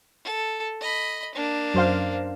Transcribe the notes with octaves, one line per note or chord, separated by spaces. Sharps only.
A4
D#5 B5
A#3 D4
F#2 C5 F5